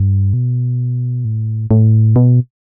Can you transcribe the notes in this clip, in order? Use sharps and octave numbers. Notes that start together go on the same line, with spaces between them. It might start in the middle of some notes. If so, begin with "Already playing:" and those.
Already playing: G2
B2
A2
A2
B2